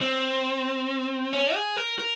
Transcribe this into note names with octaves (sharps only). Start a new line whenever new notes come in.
C4
C#4
G#4
A#4
A#4